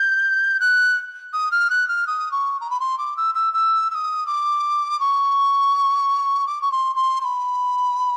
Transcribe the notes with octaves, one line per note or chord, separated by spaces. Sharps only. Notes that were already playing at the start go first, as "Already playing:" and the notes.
Already playing: G6
F#6
D#6
F6
F#6
F6
D#6
C#6
A#5
B5
C6
D6
E6
E6
E6
E6
D#6
D6
C#6
D6
C#6
C6
C6
C6
B5